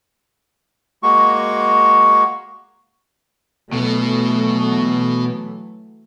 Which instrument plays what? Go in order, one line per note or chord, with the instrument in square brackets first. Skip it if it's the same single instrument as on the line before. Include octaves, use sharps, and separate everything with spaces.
[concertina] G#3 A#3 F#4 C#6
[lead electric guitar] B2 B3 [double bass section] E3 F#3 A3